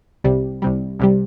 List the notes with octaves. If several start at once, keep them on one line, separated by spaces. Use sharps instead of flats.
C2 C3 G3
C2 C3 G3
C2 C3 G3